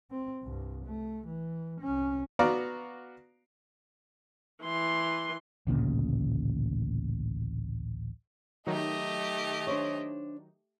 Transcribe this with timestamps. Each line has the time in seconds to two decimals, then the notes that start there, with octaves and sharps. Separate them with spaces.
0.11 C4
0.43 C2 G2
0.86 A3
1.28 E3
1.81 C2 C#4
2.39 B3 F#4 D5 F5 A#5
4.64 E3 C6
5.67 A1 D2 A#2 C#3
8.66 D#3 F#3 A3 D#4 G4 D#5
9.67 D4 C5 C#5